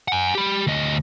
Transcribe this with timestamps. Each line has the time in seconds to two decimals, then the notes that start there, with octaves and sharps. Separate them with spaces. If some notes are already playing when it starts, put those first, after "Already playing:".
0.08 F#5 G#5
0.35 G4 B5
0.67 D2 D#5